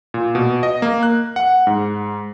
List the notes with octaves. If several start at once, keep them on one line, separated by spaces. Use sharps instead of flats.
A#2
B2
D#5
A#3
F#6
F#5
G#2